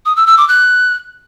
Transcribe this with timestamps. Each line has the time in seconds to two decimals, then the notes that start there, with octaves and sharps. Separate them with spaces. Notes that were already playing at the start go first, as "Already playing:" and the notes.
0.06 D#6
0.16 E6
0.27 E6
0.38 D6
0.48 F#6